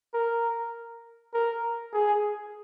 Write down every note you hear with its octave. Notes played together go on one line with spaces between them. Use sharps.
A#4
A#4
G#4